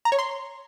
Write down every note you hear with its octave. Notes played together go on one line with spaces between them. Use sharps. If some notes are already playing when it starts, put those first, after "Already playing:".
A#5
C#5
C6